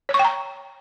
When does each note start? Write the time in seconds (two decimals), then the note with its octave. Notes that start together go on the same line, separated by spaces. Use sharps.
0.09 C#5
0.14 C#6
0.19 G5
0.25 A#5